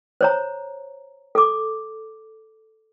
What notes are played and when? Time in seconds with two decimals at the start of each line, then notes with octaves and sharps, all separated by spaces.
0.21 C5 C#5 A#5
1.35 A4 D6